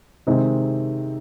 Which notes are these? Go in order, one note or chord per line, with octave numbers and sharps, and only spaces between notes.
C3 D#3 G#3 C4